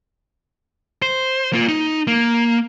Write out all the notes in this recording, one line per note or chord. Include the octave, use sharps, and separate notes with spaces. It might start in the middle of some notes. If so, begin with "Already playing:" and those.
C5
A#3 F4
D#4
A#3